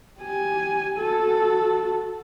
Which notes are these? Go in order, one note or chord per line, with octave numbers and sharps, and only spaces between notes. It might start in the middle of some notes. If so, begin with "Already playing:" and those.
G4 G#5
F#4 A4